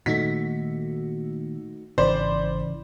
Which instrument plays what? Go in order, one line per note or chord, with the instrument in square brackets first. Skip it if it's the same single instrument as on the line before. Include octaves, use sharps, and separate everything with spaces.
[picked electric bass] A#2 D#3 [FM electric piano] A3 D#4 F#4 [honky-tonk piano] B6
[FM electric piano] G#1 B5 [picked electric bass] C#3 E3 [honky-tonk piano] C5 D5